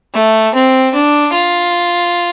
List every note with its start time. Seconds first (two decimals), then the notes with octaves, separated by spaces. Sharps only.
0.14 A3
0.54 C4
0.94 D4
1.33 F4